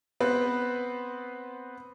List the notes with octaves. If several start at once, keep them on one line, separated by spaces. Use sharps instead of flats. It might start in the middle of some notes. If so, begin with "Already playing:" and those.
B3 C4 B4